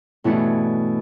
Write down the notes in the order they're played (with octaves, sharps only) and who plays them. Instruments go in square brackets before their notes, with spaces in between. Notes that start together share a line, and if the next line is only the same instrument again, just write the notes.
[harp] G2 E3 A3 C#4 E4 [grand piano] B2